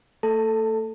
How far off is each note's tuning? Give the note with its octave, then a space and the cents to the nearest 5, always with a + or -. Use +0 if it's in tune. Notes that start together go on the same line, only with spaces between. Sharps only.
A3 +40 A4 +0 A5 +25